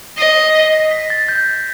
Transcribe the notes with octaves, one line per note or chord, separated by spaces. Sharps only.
D#5 C7
C7
B6
A#6
B6
A6
G6